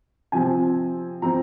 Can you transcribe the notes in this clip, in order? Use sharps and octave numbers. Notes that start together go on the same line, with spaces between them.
C3 F3 C4 G#5
F3 C4 A#5